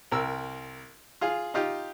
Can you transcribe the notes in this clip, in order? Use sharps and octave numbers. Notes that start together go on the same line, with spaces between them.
C2 A#4 E6
F4 G#4 F5
D#4 F4 G4